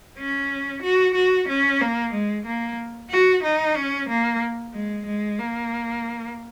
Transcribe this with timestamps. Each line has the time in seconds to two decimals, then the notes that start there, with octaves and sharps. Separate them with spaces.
0.18 C#4
0.82 F#4
1.15 F#4
1.48 C#4
1.81 A#3
2.12 G#3
2.46 A#3
3.10 F#4
3.44 D#4
3.76 C#4
4.09 A#3
4.73 G#3
5.06 G#3
5.38 A#3